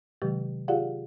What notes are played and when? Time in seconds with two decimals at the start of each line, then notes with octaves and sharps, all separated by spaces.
0.22 C3 D#3 F#3 G#3 G4
0.68 F4 G4 G#4 D5 F5 F#5